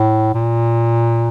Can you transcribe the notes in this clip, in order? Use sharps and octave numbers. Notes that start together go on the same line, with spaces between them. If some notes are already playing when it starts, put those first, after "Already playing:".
Already playing: A2
A#2